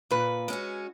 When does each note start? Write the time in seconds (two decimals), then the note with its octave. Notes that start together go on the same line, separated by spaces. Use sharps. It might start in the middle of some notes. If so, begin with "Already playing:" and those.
0.11 A#2 B4
0.48 G#3 C#4 F#4